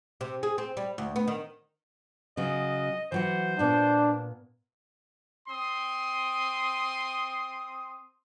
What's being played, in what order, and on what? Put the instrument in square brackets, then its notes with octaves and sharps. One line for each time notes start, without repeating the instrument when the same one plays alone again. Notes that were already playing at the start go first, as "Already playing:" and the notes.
[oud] C3
G#4
C4
G3
D2
B3
D#3
[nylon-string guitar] C#3 F#3 [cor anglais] D#5
[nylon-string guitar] E3 F#3 F#5 [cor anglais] C5
[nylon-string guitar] A#2 B3 [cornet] D4
[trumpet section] C4 C6 D#6